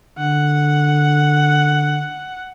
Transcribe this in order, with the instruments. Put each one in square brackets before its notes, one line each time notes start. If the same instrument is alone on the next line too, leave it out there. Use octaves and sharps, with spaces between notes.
[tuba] D3 [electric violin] F#5